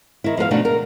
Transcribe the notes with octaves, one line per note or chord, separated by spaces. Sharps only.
D#3 E4
F3 B3 A#4 F5
B2 D3 A3 D4 D#4 F#4
A#4